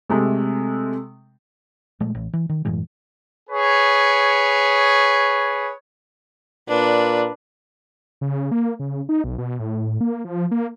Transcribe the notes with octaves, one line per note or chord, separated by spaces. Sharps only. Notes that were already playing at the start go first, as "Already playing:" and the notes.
C3 G#3 A3
A#2 F3 G#3 A3
A1
E3
D#3
F#2 A2 E3 G#3
G#4 B4 C#5
A#2 D4 B4
C#3
A#3
C#3
D#4
B1
B2
A2
A#3
F3
A#3